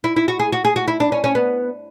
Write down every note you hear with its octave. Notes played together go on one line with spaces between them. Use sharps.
E4
E4
F#4
G#4
F#4
G#4
F#4
E4
D4
C#4
C#4
B3